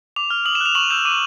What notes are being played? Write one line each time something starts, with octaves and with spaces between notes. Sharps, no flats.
D6 F7
F6
D#6 F#7
E7
F#6
F7
C#6 F#7
E6 G6 E7
D6 D#7